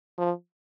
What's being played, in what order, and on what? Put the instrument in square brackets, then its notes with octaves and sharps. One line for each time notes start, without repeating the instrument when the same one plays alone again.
[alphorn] F3